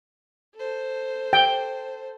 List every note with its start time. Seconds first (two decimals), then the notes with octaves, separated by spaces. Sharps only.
0.55 A4 C5
1.33 G5